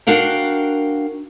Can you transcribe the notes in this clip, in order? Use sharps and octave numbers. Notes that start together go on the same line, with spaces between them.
D4 F#4 A#4 F5 G5